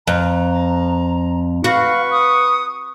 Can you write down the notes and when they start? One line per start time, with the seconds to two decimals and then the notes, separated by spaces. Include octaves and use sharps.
0.07 F2 A#5
1.64 F#4 B4 F5 C#6
2.12 D#6